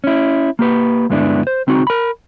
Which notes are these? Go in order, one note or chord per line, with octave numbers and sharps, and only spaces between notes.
C#4 E4
A#3 G4 B4
D2 G2 G#3 B3 D4 E4
C5
C#2 C4 D#4 F#4
A#4 B5